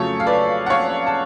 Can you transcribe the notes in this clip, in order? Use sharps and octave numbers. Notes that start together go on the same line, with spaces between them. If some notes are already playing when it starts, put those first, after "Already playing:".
Already playing: F2 C#3 F#3 A3 A4 C#5
F5
B4 D5
F#5
C#5 F5
A5